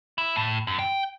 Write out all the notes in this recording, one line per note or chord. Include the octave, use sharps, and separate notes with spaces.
E4
A2
F#2
G5